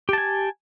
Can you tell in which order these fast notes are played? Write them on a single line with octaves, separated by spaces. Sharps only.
G4 A5 G#5